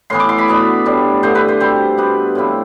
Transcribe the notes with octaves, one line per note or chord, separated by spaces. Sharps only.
A2 E3 B3 C6
D6
C6
B5
B2 B3 D4
A2 G3 D4
G2 D3 A3 C5
B4
C5
B2 G3 C4 C5
B2 B3 D4 B4
A2 F3 C4 E4